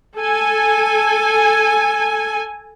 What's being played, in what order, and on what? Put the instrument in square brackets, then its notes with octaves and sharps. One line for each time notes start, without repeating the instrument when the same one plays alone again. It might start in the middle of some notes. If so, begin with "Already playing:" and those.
[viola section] A4 G#5